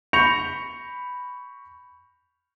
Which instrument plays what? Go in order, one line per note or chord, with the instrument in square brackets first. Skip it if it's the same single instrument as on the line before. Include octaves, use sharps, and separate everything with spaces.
[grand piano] B5 C#6 G6 A#6 C#7 F7